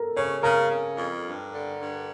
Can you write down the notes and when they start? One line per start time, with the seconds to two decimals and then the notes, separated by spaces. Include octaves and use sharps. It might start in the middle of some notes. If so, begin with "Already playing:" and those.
Already playing: A4 A#4
0.16 C#3 C#5
0.43 C#3 A#4
0.71 C#3
0.97 F2
1.25 G2
1.52 D3
1.80 G2